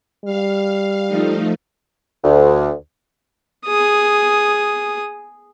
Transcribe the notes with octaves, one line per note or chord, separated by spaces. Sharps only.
G3 F5
F3 A3 D#4
D2
G#4 D#6